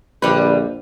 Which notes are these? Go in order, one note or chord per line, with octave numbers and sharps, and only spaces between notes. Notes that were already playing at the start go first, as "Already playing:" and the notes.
A#1 D3 G3 B4